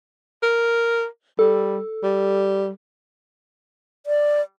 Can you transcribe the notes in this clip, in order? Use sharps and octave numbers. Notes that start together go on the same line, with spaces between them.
A#4
G3 A4
G3
D5